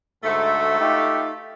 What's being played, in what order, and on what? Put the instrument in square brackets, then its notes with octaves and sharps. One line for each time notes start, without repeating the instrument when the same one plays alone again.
[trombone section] D2 G#2 [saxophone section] A3
[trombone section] D#4 F4 G4